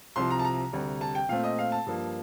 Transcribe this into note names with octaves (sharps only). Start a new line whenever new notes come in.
C2 C3 F3 C6
A#5
A5
A#5
D2 C3 G3
A5
G5
A#2 A3 C4 F5
D#5
F5
A5
G2 F3 A#3